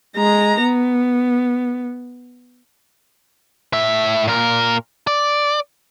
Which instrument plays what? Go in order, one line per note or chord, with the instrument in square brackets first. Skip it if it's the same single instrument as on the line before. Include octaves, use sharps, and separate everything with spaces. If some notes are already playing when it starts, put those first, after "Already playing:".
[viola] G#3 A#5
B3
[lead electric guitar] A2 E5
A#2 A#4
D5